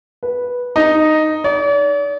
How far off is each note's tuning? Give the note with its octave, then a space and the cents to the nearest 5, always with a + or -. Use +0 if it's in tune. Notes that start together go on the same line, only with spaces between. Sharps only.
B4 -10
D#4 -5
D5 -45